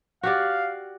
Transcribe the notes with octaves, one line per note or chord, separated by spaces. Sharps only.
F#4 G4 D5 F5